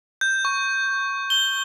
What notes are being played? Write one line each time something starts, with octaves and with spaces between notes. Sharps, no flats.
G6
C#6
G7